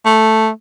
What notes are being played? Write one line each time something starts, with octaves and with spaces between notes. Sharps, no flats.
A3